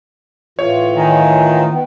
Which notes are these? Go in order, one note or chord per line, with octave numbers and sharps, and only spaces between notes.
A2 E3 F4 C#5
D#3 G#5
B3 G5